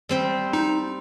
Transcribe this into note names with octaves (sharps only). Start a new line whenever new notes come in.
G3 C4 C5
D#4